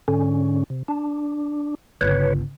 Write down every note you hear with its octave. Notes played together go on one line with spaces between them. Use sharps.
G#2 D3 C#4
C3
D4
G1 C#2 B4 C#5